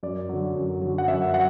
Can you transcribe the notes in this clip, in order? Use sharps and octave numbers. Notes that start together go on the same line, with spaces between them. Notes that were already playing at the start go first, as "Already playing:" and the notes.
F#2 D5
D3 F#3
F#2
D3 F#3
F#5
F#2 E5
F#3 F#5